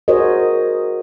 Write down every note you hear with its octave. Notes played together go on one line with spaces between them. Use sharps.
F#4 G#4 A#4 C5 C#5 D#5